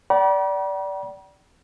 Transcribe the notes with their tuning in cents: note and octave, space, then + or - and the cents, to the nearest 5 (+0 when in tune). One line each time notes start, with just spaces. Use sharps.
D5 -15 G5 -45 B5 -45